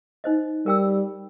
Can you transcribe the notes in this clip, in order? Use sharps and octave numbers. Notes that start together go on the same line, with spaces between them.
D#4 C5 D#5
G3 A#4 G5 E6